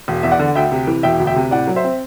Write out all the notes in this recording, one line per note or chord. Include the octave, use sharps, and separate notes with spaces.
E1
E2 E5
D5 F#5
D3
D2 E5 G5
C3
E3
E1 E5 G5
D2
E5 G5
C3
A2 D5 F#5
F#3
C5 E5
C4